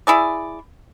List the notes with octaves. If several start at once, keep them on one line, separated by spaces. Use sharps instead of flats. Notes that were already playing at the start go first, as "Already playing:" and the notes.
E4 G#4 D5